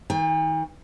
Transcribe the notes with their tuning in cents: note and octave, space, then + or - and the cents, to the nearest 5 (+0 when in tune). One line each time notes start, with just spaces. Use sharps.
D#3 +40 G#5 -45